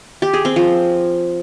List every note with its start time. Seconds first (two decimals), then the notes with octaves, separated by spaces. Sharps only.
0.22 G4
0.33 G#4
0.45 C4
0.56 F3